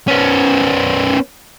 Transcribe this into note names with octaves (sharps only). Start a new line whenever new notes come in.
B3 C#4